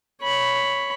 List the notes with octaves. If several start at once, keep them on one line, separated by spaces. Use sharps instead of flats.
C#5 B5